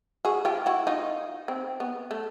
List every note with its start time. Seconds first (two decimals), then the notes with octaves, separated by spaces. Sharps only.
0.25 F#4 G#4
0.45 F4 G4
0.66 E4 F#4
0.87 D#4 F4
1.48 C4
1.80 B3
2.11 A3